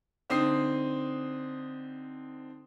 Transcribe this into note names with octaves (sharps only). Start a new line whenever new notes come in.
D3 C4 D#4 D#6 C7